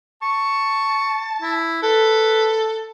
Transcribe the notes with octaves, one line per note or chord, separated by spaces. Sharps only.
A5 C#6
E4
A4 B4